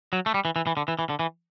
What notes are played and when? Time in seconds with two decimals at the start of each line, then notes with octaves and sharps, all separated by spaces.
0.13 F#3
0.26 A3
0.34 G3
0.45 E3
0.56 E3
0.67 E3
0.77 D3
0.88 E3
0.99 E3
1.09 D3
1.19 E3